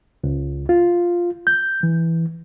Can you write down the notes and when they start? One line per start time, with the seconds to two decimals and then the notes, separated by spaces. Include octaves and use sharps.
0.24 C#2
0.69 F4
1.47 G6
1.83 E3